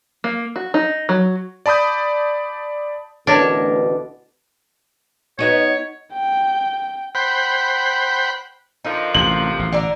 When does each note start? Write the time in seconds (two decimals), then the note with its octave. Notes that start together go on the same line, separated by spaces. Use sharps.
0.24 A#3
0.56 F#4
0.74 D#4
1.09 F#3
1.66 D5 A5 B5 D#6 G6
3.27 A1 D2 B2 D4 A#4 C#5 A5
5.39 B3 D#4 F#4 C#5
6.13 G5
7.15 C5 F#5 G5 B5
8.85 D3 D#3 F3 D#4
9.14 A1 C3 F#7
9.59 A1
9.72 D3 D5 A#5